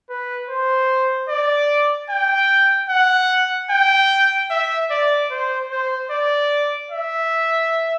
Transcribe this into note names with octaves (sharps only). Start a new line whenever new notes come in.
B4
C5
D5
G5
F#5
G5
E5
D5
C5
C5
D5
E5